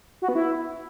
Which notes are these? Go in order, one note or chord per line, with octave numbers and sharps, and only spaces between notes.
F#4
B3
E4